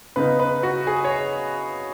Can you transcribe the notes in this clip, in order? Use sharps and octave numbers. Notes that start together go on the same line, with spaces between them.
C#3 B3 D#4 B4
B4
F#4
G#4
C#5